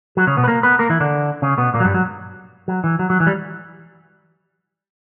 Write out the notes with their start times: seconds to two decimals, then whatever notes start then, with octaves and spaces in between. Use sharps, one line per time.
0.17 F#3 F#4
0.27 C#3 C#4
0.37 B2 B3
0.44 B4
0.48 A#3 A#4
0.63 B3 B4
0.79 A#3 A#4
0.89 E3 E4
1.00 D3 D4
1.42 C#3 C#4
1.58 B2 B3
1.74 A#2 A#3
1.80 F#3
1.85 G2 G3
1.94 F#3
2.68 F#3
2.84 E3
2.99 F#3
3.10 F#3
3.20 E3
3.27 G3